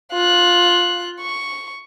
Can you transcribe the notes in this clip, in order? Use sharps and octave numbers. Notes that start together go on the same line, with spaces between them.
F4 F#6
C#6